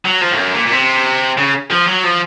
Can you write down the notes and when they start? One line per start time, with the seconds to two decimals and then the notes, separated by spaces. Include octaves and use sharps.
0.05 F#3
0.21 F3
0.31 A2
0.38 F#2
0.54 A#2
0.66 A#2
0.71 C3
1.37 C#3
1.71 F3
1.87 F#3
2.04 F3